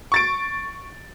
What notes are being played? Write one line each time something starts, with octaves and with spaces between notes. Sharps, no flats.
C#6 A6 D7